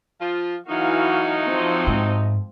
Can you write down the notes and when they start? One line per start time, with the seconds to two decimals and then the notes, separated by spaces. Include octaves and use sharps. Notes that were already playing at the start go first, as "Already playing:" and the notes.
0.21 F3 F4
0.69 E3 F#3 A3 D#4 F#4 F5
1.47 F3 C4
1.87 G#2